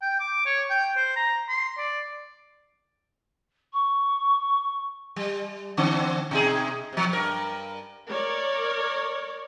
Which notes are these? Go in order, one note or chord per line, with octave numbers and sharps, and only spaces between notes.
G5
D6
C#5
G5
C5
A#5
C6
D5
C#6
G3
D3 C4 D4
B2 D#4 G#4
C3 F3
G2 A#4
A#4 C#5 D5